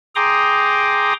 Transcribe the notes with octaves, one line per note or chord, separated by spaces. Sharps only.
G#4 G5 A#5 C6 D6 D#6